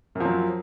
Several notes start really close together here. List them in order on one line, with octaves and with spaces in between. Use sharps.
F#2 F3 F#3